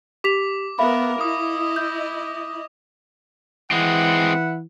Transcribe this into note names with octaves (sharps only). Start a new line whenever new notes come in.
G4 D6 B6 F7
B3 A#4 E5 F5 B5
E4 D#5 D#6
G6
E3 G#3 C4 B4 E5 F#5